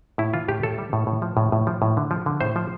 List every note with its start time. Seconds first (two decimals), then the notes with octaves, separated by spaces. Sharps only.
0.18 A2 E4
0.34 E3 F4
0.48 A2 G4
0.63 A2 A4
0.78 G3
0.93 A2
1.07 A2
1.22 F3
1.37 A2
1.52 A2
1.67 F3
1.82 A2
1.97 D3
2.11 F3
2.26 D3
2.41 A2 C5
2.56 F3